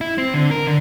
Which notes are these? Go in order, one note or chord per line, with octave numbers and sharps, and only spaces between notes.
E4
C4
D3
A#4
D3